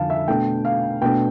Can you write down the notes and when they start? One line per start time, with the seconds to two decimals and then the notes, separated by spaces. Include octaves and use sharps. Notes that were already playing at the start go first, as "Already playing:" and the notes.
Already playing: F2 D3 F5 A5
0.10 E5
0.28 B2 A3 D4 G5
0.65 F5
1.02 B2 A3 D4 G5